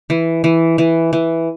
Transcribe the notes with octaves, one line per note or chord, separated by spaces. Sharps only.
E3
E3
E3
E3